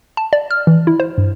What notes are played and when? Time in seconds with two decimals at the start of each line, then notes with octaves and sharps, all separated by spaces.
0.17 A5
0.33 D5
0.51 F6
0.67 E3
0.87 E4
1.00 C5
1.18 G2